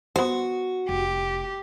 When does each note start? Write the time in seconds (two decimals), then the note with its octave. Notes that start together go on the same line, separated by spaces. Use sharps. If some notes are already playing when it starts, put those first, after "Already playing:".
0.16 B3 F#4 C5
0.89 F1 G4